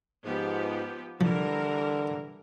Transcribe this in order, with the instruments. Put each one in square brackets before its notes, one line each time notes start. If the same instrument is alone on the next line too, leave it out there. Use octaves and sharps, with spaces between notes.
[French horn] G#2 [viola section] F3 B3 G4
[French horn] D3 [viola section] E3 G3 A#4 [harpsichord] F3